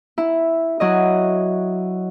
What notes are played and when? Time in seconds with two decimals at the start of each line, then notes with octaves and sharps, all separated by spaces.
0.18 E4
0.80 F#3 E4 D#5